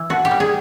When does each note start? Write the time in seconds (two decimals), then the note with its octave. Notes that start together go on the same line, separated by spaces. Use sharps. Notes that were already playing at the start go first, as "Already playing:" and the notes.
Already playing: E3
0.10 B2 F#4
0.25 G4
0.31 G3
0.40 G#4